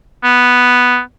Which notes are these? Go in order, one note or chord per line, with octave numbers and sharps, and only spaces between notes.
B3